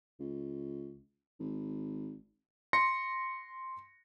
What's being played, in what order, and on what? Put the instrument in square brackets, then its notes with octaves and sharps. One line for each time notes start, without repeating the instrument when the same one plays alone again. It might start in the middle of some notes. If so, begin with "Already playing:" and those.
[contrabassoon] C#2
G#1
[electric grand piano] C6 A#6 C#7